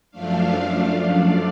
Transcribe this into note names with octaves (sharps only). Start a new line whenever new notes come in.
F#2 F3 A3 D4 F5
D5